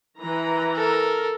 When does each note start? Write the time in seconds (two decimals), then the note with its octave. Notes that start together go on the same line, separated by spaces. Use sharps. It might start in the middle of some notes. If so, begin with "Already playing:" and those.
0.19 E3 B4 A#5
0.76 A4 A#4